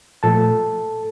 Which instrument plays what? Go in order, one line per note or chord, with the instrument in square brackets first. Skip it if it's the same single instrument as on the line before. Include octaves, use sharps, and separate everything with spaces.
[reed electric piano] A#2 F3 A3 A4 A5